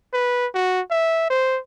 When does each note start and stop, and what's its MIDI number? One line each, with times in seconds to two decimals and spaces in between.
0.13 0.47 71
0.54 0.81 66
0.91 1.29 76
1.30 1.59 72